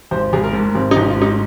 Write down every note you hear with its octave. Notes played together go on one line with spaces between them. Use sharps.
G#1 C5
G#1 G#4
A#4
G#2
G#1 C4
D#4
G#1
F4
G#2
D#4